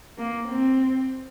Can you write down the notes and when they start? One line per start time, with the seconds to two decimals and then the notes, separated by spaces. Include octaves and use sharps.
0.18 A#3
0.48 C4